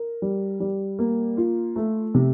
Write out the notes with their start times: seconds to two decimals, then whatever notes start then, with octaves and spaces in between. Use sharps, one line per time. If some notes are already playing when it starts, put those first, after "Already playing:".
Already playing: A#4
0.22 G3
0.60 G3
0.99 A#3
1.37 F4
1.76 A3
2.14 C3